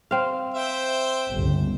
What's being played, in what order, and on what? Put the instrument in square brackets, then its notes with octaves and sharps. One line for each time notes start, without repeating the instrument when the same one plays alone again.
[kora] C4 F5
[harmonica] C5 E5 G5
[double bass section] G1 C#2